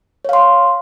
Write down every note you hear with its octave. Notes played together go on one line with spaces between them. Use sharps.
C#5 F5 C6